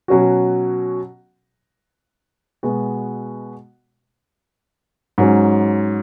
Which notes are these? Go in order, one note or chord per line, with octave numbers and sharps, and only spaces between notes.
B2 F#3 C#4 F#4
B2 G#3 B3 F#4
G#2 F#3 C#4